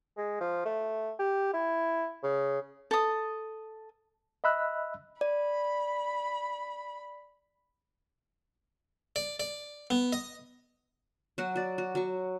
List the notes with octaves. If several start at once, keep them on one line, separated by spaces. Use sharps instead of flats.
G#3
F3
A3
G4
E4
C#3
A4 D#6
D#5 E5 B5 E6 F#6
D5 B5
D5
D5
B3
D#5
F#3 F#4 F#5
F#4 D5
F#4
F#3 C#6